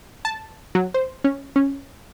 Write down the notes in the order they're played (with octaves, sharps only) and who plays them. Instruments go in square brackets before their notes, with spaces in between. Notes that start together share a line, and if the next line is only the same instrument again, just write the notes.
[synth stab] A5
F#3
C5
C#4
C#4